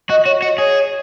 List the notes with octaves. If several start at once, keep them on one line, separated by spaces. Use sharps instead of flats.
F#4 D#5
F#4 C#5
F#4 D#5
G#4 C#5